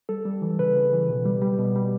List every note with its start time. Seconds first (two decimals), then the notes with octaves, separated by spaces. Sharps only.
0.09 G3 A4
0.26 G3
0.42 E3
0.59 C#3 B4
0.76 C#3
0.93 E3
1.09 B2
1.25 G3
1.42 G3
1.59 B2
1.76 G3